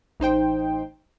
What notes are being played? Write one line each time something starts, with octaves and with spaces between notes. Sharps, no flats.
A1 D#4 C5 G5